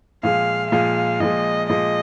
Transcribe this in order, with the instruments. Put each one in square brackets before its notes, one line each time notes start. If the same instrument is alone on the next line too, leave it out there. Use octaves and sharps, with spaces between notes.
[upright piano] A#2 F3 G#3 [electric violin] F5
[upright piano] A#2 F3 G#3 [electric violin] F5
[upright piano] A#2 F3 G#3 [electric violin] D#5
[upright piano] A#2 F3 G#3 [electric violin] D#5